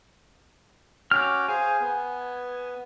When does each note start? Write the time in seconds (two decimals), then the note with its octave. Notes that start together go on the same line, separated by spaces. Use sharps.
1.11 C#4 F#4 G5 D6 F6
1.48 G#4 C5 F5 G#5
1.80 B3